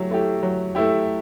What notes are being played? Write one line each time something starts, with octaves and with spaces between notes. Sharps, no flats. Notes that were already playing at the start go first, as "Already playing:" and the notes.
Already playing: F#3 A3 E4 G4
A3 E4 G4
F#3
A3 E4 G4